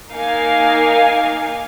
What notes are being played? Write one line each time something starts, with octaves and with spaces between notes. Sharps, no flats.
A#3 D#4 A#4 F5 G#5